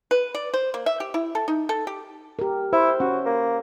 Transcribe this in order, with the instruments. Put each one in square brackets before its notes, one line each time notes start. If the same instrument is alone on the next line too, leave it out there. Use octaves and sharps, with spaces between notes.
[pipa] B4
D5
C5
A#3
E5
G4
E4
A4
D#4
A4
G4
[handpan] G4 A#4
[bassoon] E4 [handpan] C5
[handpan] C#4 [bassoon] F#4
[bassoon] A#3